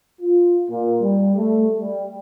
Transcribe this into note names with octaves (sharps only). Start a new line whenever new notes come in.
F4
A#2
G3
A3
G3